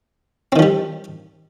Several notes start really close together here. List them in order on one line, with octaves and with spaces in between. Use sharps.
C4 D#3 F3 G3